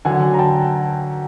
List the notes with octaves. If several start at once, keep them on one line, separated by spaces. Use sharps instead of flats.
D3 F#3 F#5 G#5
A#5
G5 A5